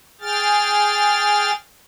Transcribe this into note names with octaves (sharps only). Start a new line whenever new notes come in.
G#4 G5 F6 A6